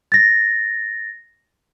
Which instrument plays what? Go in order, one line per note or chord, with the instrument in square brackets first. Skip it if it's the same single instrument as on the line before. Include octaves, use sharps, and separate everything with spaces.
[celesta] A6 A#6